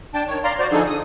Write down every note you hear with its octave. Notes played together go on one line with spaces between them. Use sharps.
D4 G5 A5
D#3 C#5
D5 F5 A#5 C6
F#4 C5 D5
D3 F3 D4 D#4 G#4 A4
D#6